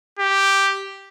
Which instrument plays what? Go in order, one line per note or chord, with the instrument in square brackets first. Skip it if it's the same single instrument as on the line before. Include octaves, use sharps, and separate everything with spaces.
[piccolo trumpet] G4